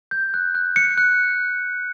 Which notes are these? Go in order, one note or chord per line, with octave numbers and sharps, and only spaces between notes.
G6
F#6
F#6
F#6 C#7
F#6